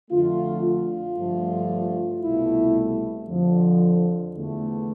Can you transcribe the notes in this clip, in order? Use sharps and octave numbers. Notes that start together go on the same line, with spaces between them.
F2 D3 A3 F4
F4
G2 D3 F3 A3
C2 B2 A3 E4
F2 D3 F3
E2 D3 A3